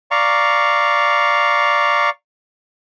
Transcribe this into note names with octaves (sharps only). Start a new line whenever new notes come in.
D5 F5 A#5 C#6